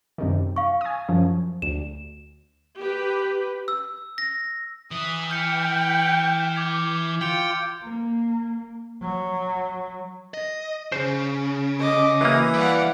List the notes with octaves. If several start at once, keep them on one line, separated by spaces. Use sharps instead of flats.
F#2 C3 D#3
F5 C#6
G#5 D#6
F#2 F3
D2 E7
G4 B4
E6
A#6
E3 D#6
G5 F6 G6 C#7
D6 G#6
F4 G5 G6 C#7 F7
A#3
F#3
D#5
C#3 C5
D#5 D6
E3 F#3 A#3 D#6
G3 D5 F5 F#5